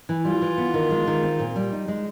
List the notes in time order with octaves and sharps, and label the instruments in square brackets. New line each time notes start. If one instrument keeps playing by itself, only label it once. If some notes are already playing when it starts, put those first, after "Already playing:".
[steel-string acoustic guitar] E3
[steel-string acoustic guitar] G3 [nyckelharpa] F4
[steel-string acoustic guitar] E3
B3
D#3
G#3
D#3
C4
A#2
G3
D#4
G#3